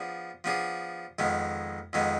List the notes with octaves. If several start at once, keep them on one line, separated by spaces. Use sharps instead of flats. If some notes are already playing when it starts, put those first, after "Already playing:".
Already playing: F3 B3 D4 G#4
F3 B3 D4 G#4
F2 D#3 G#3 B3
F2 D#3 G#3 B3